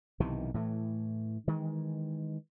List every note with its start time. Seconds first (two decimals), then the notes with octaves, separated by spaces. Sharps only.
0.20 B1 C3 D#3 E3
0.54 A2 E3 A3
1.47 D#3 E3 G#3